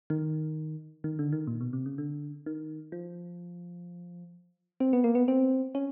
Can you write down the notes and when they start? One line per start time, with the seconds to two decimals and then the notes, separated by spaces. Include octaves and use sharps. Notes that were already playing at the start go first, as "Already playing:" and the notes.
0.10 D#3
1.04 D#3
1.19 D3
1.32 D#3
1.47 A#2
1.61 B2
1.73 C3
1.86 C#3
1.98 D3
2.46 D#3
2.92 F3
4.80 C4
4.93 B3
5.04 A#3
5.15 B3
5.28 C4
5.75 C#4